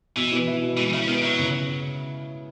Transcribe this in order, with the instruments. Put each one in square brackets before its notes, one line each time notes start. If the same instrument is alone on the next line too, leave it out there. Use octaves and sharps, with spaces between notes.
[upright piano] B2 [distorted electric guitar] E3
[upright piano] B3
E4
B2
[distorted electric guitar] E3 [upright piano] G#3
[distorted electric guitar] C#3 [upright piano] E4
[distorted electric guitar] D#3 [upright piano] B3
[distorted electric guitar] F#3 [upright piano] E4
[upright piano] C#3